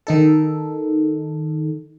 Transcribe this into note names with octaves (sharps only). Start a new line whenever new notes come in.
D#3 D#4 A4